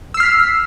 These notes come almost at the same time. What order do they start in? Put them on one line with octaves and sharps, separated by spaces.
E6 C7 F6 B6